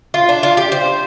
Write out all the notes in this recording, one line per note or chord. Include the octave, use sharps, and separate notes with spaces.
F4
D4
F4
G4
C5